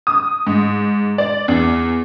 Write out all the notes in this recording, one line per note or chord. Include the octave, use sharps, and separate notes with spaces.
D#6
G#2
D5
E2